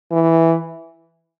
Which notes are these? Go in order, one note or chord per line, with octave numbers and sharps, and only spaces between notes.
E3